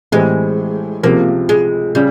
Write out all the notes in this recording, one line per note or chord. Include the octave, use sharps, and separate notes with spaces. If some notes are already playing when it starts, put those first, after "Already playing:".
A2 E3 G3 G#3 C4
C#2 C3 F3 A#3
G#3
C#3 G3